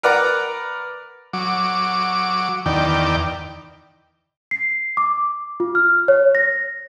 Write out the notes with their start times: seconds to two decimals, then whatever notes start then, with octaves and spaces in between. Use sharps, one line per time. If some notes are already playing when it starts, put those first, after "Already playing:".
0.03 A#4 B4 D5 F#5 A#5
1.33 F#3 D6
2.66 E2 D#3 D5 G5
4.51 C7
4.97 D6
5.60 F4
5.75 F6
6.08 C#5
6.35 A#6